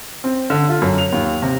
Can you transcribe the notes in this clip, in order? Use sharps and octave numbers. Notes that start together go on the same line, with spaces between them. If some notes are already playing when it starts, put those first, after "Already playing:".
C4
D3
F4
F#2
F7
D#2
C3